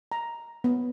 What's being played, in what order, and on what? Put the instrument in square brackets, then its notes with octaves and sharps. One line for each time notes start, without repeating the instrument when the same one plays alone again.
[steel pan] A#5
B3